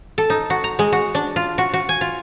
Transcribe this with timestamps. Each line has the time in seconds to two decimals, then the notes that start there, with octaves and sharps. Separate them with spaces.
0.18 A4
0.30 D#4
0.50 F#4
0.64 A#5
0.79 G#3
0.92 F#4
1.15 D4
1.36 F4
1.58 F#4
1.73 F#4
1.89 G#5
2.01 F4